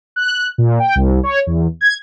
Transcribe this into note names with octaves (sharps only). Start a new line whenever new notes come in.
F#6
A#2
G5
C2
C#5
E2
G#6